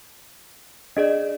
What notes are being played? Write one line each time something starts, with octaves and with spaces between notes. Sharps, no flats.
D4 G#4 D5 D#5